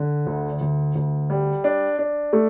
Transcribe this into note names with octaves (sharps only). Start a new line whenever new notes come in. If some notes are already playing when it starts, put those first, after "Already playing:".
Already playing: D3
D2
D2
D2
G3
D4
D4
A3